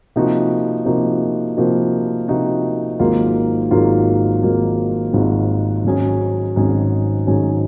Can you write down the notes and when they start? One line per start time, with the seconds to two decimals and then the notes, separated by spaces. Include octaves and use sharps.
0.16 C3 F3 A#3 D#4 F#4
0.86 C3 F3 A#3 D#4 F#4
1.57 C3 F3 A#3 D#4 F#4
2.28 C3 F3 A#3 D#4 F#4
3.00 G#1 G#2 F#3 A#3 F4
3.71 G#1 G#2 F#3 A#3 F4
4.43 G#1 G#2 F#3 A#3 F4
5.14 G#1 G#2 F#3 A#3 F4
5.84 G#1 G#2 F#3 C#4 G#4
6.56 G#1 G#2 F#3 C#4 G#4
7.27 G#1 G#2 F#3 C#4 G#4